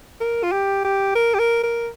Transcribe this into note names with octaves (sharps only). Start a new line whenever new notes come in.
A#4
F4
G4
G4
A#4
G4
A#4
A#4